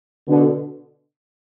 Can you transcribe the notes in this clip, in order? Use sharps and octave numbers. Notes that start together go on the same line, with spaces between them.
B2 D3